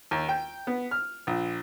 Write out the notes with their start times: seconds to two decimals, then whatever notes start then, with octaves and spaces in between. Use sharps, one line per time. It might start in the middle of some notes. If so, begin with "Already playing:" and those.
0.11 D#2
0.29 G5
0.67 B3
0.91 F6
1.27 A#1